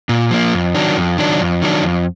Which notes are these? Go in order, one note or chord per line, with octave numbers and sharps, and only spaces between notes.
A#2
F3 A#3
F2
D#3 F#3 D4
F2
D#3 F#3 D4
F2
D#3 F#3 D4
F2